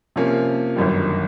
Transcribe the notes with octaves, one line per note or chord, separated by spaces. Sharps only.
C3 F3 A#3 C#4
G1 F#2 D#3 G3